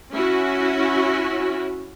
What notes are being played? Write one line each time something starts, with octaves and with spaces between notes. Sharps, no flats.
C#4 E4 F#4